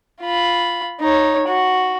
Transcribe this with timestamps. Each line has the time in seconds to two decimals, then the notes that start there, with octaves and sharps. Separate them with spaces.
0.21 F4 B5
1.00 D#4 C#5
1.48 F#4